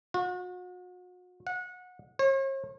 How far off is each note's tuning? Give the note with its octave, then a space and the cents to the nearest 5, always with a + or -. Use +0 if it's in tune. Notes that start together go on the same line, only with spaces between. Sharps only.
F#4 -40
F#5 -25
C#5 -45